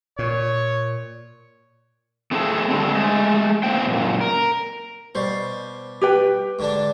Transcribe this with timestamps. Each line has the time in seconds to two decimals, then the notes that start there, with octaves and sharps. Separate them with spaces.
0.19 A#2 C#5
2.31 A3 C4 E4 G#4 A4 A5
2.70 D3 G3 C4
2.91 G#3 A3
3.63 E2 A#3 C5 G5
3.89 F#2 A#2
4.21 A#4
5.15 B2 G3 C5
6.01 G4 B4 G5
6.59 G#2 D3 D4